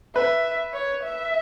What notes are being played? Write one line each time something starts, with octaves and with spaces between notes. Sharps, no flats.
B4 E5
C#5
E5